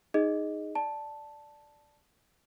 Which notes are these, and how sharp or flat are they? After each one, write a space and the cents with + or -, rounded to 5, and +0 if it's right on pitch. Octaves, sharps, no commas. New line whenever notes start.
D#4 +0 G#4 +0 D#5 +0
D5 +0 A5 +0